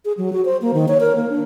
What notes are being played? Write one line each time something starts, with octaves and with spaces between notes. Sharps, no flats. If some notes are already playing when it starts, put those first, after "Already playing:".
G#4
F#3
F#4
C5
A#3
D#3
C#5
A#4
A#3
D4